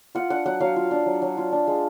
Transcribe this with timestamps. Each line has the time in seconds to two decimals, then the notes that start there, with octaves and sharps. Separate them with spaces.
0.15 F4 F#5
0.30 D4 F#5
0.46 F#3 F#5
0.60 F#3 F5
0.76 F4
0.91 D4
1.06 F#3
1.22 F#3
1.37 F4
1.52 D4
1.67 G#3